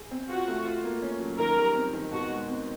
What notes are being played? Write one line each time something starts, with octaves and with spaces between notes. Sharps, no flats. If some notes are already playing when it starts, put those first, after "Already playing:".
Already playing: G#4
C4
F4 F#4
A3
F4
A#3
C#4
F#3
D#3 A#4
G3
C4
D#3
B2 F#4
G#3
C4